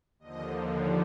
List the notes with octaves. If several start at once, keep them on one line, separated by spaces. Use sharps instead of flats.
D#2 D3 F3 D#5